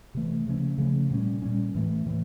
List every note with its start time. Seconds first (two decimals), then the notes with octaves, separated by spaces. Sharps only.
0.15 C3 E3 A3
0.46 C#3 F3 A3 C#4
0.78 C#3 F3 A3 C#4
1.11 A#2 G3 A#3 C#4
1.42 A#2 G3 A#3 C#4
1.75 A2 E3 A3
2.06 A2 E3 A3